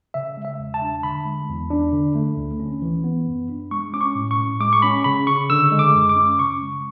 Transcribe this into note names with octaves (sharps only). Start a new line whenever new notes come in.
C#3 E5
G#3
E5
E2
A5
D4
D3 B5
G#3
E2
D4
D3
A3
D2
C#4
E3
B3
F#2
D4
G#3 C#6
C#4 D6
C#6
A2
C#6
A2
G#3 D6
C#6
C#4 B5
C#3 B5
C#3 C#6
D3 E6
G#3
D6
F#2
D6
C#4
C#3 C#6
G#3